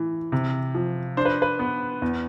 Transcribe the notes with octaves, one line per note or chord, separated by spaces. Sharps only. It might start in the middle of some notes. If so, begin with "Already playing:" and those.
Already playing: A2 E3
C3
F3
D4 C5
B4
B4
B3
E2